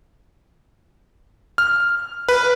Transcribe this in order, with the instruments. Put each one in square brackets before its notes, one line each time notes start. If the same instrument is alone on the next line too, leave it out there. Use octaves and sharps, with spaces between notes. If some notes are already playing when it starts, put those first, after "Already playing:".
[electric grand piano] F6
B4